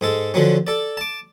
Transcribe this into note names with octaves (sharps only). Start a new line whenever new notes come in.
G#2 G#3 A4
D3 F3 F#3 C#4
A4 D5
A5 D6